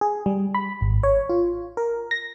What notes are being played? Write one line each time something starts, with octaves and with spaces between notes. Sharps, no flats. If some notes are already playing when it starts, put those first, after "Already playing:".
G#4
G3
B5
G#1
C#5
F4
A#4
A#6